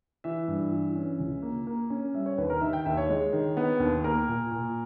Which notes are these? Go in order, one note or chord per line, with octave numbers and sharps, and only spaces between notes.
E3 E5
G2
E3
C#4
C#2
A#3
A#3
C#4
G3 E5
C#5
D#2 B4
A#4
D#3 E5
G5
D#2 E5
C#5
G#3
D#3
B3
D#2
A#3 A#4
A#2
A#2